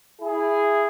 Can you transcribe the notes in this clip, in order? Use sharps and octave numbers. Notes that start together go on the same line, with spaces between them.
E4 G#4